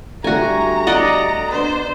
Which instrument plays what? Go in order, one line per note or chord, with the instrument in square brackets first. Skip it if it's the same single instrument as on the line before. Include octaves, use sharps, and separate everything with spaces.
[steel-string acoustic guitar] D3 G3 A3 [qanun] F#4 G#5 [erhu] A#5
[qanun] D5 D#5 F#5
[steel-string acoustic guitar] B3 D4 [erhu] C5